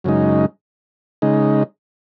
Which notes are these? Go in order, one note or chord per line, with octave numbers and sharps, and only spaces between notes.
F#2 C#3 G#3 D#4
C#3 G#3 D#4